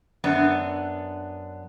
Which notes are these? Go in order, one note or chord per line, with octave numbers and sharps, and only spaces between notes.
F#2 B3 D4